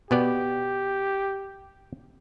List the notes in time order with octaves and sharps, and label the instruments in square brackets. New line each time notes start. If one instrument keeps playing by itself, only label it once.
[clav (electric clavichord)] B2 B3 D5 [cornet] G4